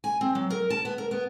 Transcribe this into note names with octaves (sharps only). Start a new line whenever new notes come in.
G#5
C4
F#3
A#4
A5
B3
A#4
B3